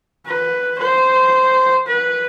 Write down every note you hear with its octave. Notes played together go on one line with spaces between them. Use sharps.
B4
C5
B4